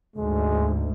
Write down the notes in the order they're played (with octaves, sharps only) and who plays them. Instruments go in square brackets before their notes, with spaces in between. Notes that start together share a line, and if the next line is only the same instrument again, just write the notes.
[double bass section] D2 G#2 [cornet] G#3